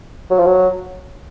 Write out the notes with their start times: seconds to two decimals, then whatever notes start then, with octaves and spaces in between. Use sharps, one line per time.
0.30 F#3
0.39 F3
0.46 F#3